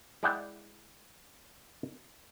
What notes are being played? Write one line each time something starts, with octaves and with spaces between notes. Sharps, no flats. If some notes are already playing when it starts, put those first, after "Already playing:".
G#3 E4 D5 F#5 G5